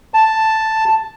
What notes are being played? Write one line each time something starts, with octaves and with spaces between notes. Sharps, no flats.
A5